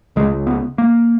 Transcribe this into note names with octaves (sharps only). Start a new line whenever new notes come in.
C#2 C#3 G#3
B3
A#3